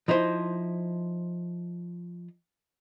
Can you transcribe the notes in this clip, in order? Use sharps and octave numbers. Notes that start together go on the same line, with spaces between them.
F3 D#4 E4 C5